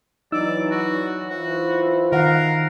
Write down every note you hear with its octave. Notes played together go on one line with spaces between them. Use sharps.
E3 F#3 D#4 D5 E6
F#4
E3 F4 F#4 C5
D#3 A#4 F5 F#5